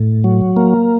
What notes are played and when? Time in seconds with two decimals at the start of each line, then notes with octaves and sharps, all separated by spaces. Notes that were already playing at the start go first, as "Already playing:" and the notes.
Already playing: A2
0.24 F#3
0.56 A#3